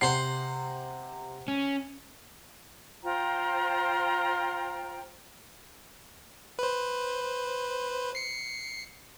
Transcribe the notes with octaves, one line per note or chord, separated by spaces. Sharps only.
C3 C5 F#5 C7
C#4
F4 C5 G5 A#5
B4 C5
C7 C#7